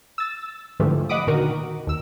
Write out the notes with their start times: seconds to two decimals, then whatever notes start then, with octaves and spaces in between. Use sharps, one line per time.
0.18 E6 A6
0.80 G#2 D3 E3 F3 G3 A3
1.09 D#5 F#5 B5 D6 D#6
1.27 A#2 D3 D#3 F#4 A#4
1.87 D#2 E6